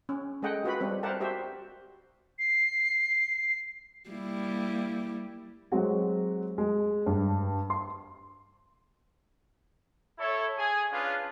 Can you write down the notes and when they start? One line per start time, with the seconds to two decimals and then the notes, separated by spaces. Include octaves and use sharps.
0.09 C#4
0.42 G#3 G#4 A4 D#5 F#5 G5
0.64 F4 F#4 B4 B5
0.80 G3 C4 B4
1.03 A#4 C5 D5 E5 F#5 A5
1.20 F#4 G4 C5 E5
2.39 C7
4.10 G3 A#3 E4
5.71 F#3 G#3 C4 F#4 G4
6.58 G#3
7.06 G2
7.70 C6
10.19 E4 A4 C#5
10.58 G#4 G#5
10.92 C#4 D4 F4 G#4 B4 F5